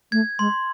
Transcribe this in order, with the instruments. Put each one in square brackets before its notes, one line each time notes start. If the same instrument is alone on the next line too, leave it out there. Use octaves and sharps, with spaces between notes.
[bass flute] A3 [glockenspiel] G#6
[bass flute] G#3 [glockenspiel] C6